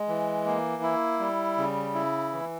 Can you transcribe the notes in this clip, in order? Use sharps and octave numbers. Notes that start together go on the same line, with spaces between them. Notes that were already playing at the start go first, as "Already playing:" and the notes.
Already playing: G#3
E3
A#3
E4
G3
C#3
E4
E3